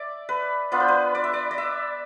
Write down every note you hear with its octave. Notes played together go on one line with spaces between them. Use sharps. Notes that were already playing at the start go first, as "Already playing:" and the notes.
Already playing: D5 E5
B4
B3 D4 F4 B4
C5
B4
D5
E5
D5
D5
E5